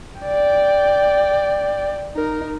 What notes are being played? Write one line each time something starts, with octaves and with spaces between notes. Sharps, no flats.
D5 G5
D#4 A#4